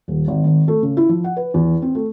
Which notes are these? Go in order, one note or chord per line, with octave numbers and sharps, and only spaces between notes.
D#1
G#1
G#1
A3
C#3
E4
F3
F#5
B4
E2
C4
A3